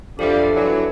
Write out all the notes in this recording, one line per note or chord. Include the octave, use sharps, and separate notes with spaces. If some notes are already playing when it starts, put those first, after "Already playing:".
F2 F3 G3 D4 A4 E5
E3 F#3